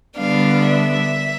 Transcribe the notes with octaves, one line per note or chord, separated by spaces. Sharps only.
D3 G3 B3 D4 F5
E5